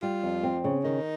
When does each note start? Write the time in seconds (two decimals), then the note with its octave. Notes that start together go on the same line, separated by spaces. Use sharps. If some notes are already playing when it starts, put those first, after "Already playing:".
0.02 G3 F4
0.23 F2
0.43 C4
0.64 C#3
0.84 D#3 D#4